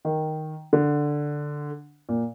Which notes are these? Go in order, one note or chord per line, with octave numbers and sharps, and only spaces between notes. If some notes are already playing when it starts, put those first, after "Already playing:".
D#3
D3
A#2